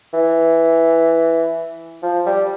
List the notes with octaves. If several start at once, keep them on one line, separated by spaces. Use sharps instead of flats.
E3
F3
G3